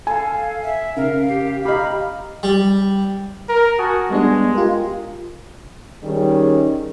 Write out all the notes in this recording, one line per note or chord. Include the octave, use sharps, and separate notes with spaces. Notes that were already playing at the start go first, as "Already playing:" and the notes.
A4 F5 G#5
E5
C#3 A#4 F5
G4
G4 D#5 F5 A#5 B5 F6
G3
A#4
F#4 G#5 A5 D#6
G3 G#3 B3 D4
F4 G4 A#4
D#3 G3 C#4 G#4